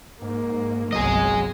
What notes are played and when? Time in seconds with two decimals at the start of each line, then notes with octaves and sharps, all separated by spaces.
0.22 G#2 A#3
0.92 G1 C2 F#3 G#4 D#5